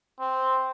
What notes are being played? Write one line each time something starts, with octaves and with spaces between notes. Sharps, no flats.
C4